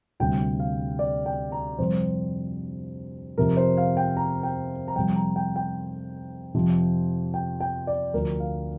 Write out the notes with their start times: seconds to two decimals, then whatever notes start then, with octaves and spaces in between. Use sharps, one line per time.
0.20 D2 C3 G3 G5
0.59 F5
0.99 D5
1.26 G5
1.52 A#5
1.78 F2 C3 G3 C5
3.38 F2 C3 F3 A#4
3.57 C5
3.77 F5
3.97 G5
4.17 A#5
4.43 G5
4.88 A#5
4.96 F2 C3 G3 G5
5.16 A#5
5.36 G5
5.56 G5
6.54 F2 C3 F3
7.34 G5
7.61 G5
7.87 D5
8.14 D2 D3 F3 A#4
8.40 F5